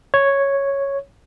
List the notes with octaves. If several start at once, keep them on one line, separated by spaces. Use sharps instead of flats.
C#5